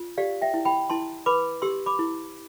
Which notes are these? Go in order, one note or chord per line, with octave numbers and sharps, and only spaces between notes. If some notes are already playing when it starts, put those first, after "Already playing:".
Already playing: F4
G4 D5 F5
E5 G5
E4
G5 B5
E4 A5 C6
B4 B5 D6
G4 C6 E6
B5 D6
E4